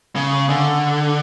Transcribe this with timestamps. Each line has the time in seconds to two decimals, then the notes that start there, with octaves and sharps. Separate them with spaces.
0.16 C#3
0.49 D3